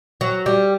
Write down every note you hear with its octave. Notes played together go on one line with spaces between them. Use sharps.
F#3
G3